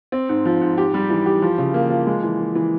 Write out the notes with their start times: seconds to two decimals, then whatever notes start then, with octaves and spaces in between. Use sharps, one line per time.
0.12 C4
0.29 G#2
0.45 F3
0.61 G#2
0.78 G4
0.94 G3
1.10 E3
1.26 G4
1.42 F3
1.58 C#3
1.74 A#3
1.90 F3
2.07 G#3
2.23 E3
2.39 E3
2.55 E3